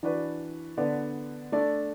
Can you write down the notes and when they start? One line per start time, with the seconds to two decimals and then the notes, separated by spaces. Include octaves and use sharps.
0.03 E3 D4 F#4 B4 D5
0.77 D3 B3 D4 B4 D5
1.52 A3 D4 A4 D5